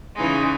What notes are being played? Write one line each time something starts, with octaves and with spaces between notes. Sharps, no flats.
C#3 E3 G#3 D#4